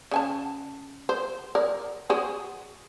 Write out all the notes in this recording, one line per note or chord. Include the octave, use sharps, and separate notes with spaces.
C#3 G#5 A5
C5
A#4 D5
F#4 G#4 C5